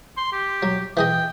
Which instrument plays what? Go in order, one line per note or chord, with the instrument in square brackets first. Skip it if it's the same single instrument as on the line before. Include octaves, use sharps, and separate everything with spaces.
[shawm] C6
G4
[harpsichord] F#3
[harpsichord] E3 G#4 D#5 [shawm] G5